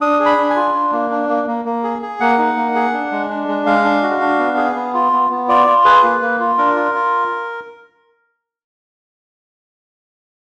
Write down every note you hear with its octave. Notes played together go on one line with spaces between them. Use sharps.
D4 D#6
G#4
B5
D4
G#5
F4
D4
A#3
D4
A#3
A#3
A#3
G#4
G#4
A#3 F#5
D#4
A#3
G#4
D4
G#3
D4
G#3
G#3 F5
D4
F#4
D4
B3
G#4
B3
F4
B3
B3
F4 D5
F4
G#4 B4
A#3
A#3
F4
D4 A#4
F4
F4